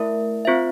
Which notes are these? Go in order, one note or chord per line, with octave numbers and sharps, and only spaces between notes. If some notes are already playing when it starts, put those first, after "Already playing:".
Already playing: A3 E4 A#4 E5
C4 F4 C5 E5